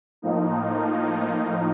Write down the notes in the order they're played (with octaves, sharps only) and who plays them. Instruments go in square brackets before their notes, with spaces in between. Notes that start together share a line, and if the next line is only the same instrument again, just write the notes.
[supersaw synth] A2 F3 A#3 D#4